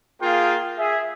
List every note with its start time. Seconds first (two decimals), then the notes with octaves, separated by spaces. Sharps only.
0.22 A#3 F4 G#4 F5 G5
0.79 G#4 E5